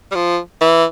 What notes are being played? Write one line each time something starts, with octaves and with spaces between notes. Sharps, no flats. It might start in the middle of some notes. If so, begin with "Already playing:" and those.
G3
F3
E3